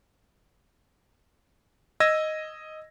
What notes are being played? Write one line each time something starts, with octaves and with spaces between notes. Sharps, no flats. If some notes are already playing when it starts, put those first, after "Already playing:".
D#5 E6 G#6 A#6 D#7